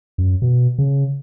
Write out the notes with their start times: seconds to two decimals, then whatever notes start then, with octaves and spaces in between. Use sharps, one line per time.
0.18 F#2
0.42 B2
0.78 C#3